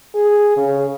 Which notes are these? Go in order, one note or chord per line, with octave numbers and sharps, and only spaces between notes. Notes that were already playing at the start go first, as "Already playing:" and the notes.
G#4
C#3